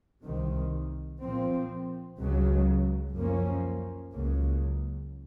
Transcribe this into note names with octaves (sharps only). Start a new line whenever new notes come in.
C2 C3 D#3
A#2 F3 C4
C#2 C#3 F#3
F#2 F3 A#3 C#4
C#2 C#3 F#3 A#3